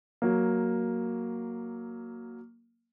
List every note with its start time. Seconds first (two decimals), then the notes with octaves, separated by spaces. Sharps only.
0.22 F#3 A#3